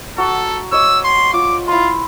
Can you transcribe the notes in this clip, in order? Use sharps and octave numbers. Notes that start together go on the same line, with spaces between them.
F#4 A4 A#5
C#5 D#5 D6 E6
C6
F4 D6
E4 F4 C6